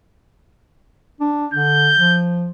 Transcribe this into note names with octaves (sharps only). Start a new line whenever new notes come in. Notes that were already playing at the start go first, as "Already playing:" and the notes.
D4
D3 G6
F3